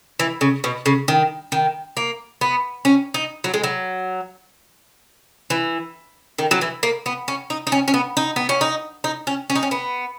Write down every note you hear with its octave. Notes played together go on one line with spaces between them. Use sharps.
E3
C#3
B2
C#3
D#3
D#3
A#3
B3
C#4
D#4
F#3
G#3
F#3
E3
D#3
F#3
E3
A#3
B3
C#4
D#4
D#4
C#4
C#4
B3
D#4
B3
C#4
D#4
D#4
C#4
C#4
D#4
C#4
B3